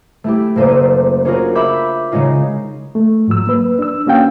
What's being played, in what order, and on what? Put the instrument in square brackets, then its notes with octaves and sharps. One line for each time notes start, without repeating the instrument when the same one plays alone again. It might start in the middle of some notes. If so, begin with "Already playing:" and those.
[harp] A3 E4 G4
F#1 A#3 A4 C5 D5 D#7
C#4 D4 F4 F#4 G#4 A#4
E5 B5 D6 G6
C#3 G#3 C#4 D#4 F4
[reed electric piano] A3
G#2 F3 F#3 E6
A#3 B4
D4 E6
A#3 C#4 F#4 F5 G5